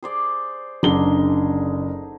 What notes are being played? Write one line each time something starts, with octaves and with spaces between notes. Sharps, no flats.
G#4 C5 D5
F#1 D3 D#4 G#4 G7